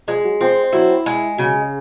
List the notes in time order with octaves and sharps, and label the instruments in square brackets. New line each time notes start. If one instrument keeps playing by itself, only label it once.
[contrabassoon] F3 [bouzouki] G#3
[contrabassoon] F#3
[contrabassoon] F3 [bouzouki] C4
[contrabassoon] F#3 [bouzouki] E4
[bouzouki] G#3
[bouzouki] C#3 [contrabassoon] F#3